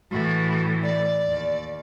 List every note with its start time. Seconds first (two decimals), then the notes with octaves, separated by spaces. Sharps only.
0.11 A2 E3 F#4
0.83 D5
1.27 D#2